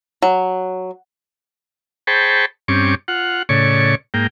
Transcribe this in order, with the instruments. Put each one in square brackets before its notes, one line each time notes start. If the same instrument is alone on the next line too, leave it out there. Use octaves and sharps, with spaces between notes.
[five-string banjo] F#3
[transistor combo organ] G#4 C5 G5 A5 B5 C#6
G2 C4 C#4 C#6 D6
F4 F#5
A2 C#3 C#5 D5 C#6
G#2 A#3 G5